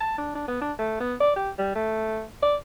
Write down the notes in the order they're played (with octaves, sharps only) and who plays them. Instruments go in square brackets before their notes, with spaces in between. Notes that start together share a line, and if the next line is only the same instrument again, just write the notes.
[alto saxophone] A5
D4
D4
B3
D4
A3
B3
D5
G4
G3
A3
D5